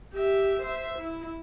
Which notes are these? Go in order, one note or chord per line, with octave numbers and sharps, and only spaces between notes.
G4 E5
C5 E5
E4